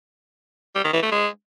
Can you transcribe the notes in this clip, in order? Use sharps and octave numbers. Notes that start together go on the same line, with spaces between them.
G3
D#3
E3
A3
G#3